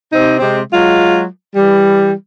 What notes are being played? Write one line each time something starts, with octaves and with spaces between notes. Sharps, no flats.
C3 C4 D#4
C3 G#3 C4
F#3 G#3 F4
E3 G3